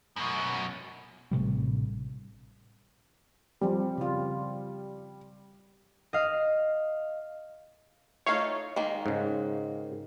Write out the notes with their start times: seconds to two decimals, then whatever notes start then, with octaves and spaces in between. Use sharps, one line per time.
0.16 F#2 B2
1.31 A1 A2 C3 G3
3.61 F3 G3 C4
3.98 C#3 F4
6.13 D#5 F5
8.26 A3 D#4 F4 C#5 F5
8.76 D#3 G#3 A#3
9.06 G#2 C#3